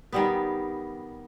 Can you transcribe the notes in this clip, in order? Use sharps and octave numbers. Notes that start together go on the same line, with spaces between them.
D#3 G3 B3